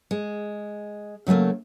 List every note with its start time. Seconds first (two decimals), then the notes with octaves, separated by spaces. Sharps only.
0.11 G#3
1.27 C#3 F#3 G3 A3 A#3